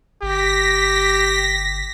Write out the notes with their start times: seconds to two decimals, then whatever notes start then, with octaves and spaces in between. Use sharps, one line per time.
0.22 G1 G4 A#6 B6